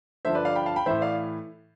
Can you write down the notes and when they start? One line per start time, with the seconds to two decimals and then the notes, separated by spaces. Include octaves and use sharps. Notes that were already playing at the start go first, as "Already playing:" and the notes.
0.25 G2 D3 F3 C5 E5
0.35 B4 D5
0.45 D5 F5
0.55 G5 B5
0.66 F5 A5
0.76 G5 B5
0.86 A2 E3 C5 E5
1.01 D5 F5